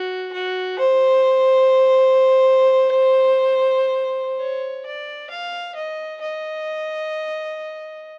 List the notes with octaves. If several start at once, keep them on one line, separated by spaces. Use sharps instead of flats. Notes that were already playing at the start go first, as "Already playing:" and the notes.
Already playing: F#4
F#4
C5
C#5
D5
F5
D#5
D#5